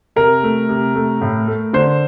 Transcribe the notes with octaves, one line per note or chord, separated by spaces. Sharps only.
C3 A#4
A3
C3
A3
A2
A3
D3 C5